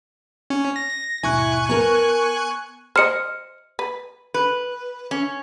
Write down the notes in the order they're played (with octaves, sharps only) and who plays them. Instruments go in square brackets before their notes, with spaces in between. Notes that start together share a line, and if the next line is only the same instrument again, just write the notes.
[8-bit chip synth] C#4
A#6
[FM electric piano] D#2 G#2 B2 [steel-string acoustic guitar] E4 [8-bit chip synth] G#5 C#6 F#6
[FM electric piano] B3 [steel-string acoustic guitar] A#4 A5
[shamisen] C5 D#5 [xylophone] F6 C#7
[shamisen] B4
[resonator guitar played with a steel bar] B4
C#4